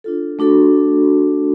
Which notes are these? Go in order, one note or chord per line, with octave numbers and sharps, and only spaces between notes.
D4 F4 A4
A3 D4 F#4 A4